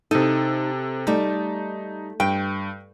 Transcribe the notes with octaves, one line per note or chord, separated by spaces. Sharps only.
C3 D#4 A4
G3 A3 D#4
G2 G5